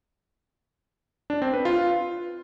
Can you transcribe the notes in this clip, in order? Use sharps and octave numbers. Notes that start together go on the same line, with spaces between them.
D4
C4
B4
F4